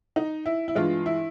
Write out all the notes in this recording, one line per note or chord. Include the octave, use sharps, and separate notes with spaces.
D#4
E4
E4
G2 E3 G#3 F4
E4